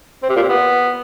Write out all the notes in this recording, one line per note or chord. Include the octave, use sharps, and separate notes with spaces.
C4
C3
A#2
C3
B3